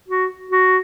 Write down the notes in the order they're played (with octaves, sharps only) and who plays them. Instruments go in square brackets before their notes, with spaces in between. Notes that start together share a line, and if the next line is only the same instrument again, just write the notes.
[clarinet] F#4
F#4